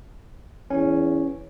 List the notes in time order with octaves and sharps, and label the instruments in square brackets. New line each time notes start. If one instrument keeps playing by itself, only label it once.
[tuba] E2 [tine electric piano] C#4